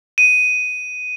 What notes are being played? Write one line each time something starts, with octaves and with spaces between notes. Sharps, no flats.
D#7